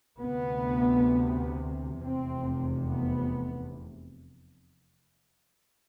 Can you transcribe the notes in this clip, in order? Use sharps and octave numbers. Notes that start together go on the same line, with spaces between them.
D2 C3 B3
F1 E2 C3 C4
B3